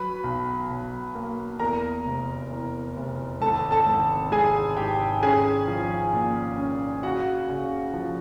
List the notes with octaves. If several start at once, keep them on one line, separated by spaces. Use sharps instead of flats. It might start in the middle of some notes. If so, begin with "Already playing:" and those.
Already playing: F#3 B4 B5
B1
B1
A#3
E2 A#4 A#5
F1
E2
F1
G#1 A4 A5
A4 A5
G#1
G#1 G#4 G#5
G#2 G4 G5
C#4 G#4 G#5
F3
A#2
C#4
C#3 F#4 F#5
C#3
F3